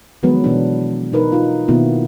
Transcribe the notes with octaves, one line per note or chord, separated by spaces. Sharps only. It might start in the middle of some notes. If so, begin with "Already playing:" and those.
D#3 F3 F#3 G#3 B3 B4
B2 E3 D4
B2 D#4 A#4 B4
D#4 F4
B2 D#3 A#3 B3 E4 F4